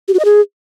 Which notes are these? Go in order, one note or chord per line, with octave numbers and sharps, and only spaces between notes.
G4
F#4
D#5
G#4